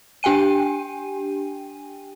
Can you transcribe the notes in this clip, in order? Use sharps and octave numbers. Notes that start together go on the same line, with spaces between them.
D4 G4 G5 G#5 D#7